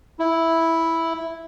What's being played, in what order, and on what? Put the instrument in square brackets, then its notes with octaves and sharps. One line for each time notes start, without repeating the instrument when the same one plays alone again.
[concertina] E4